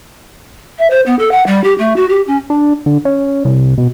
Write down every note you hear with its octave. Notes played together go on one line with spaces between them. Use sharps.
E5
C5
B3
A4
F#5
G3
G4
A3
F#4
G4
C#4
D4
D3
C#4
C2
B2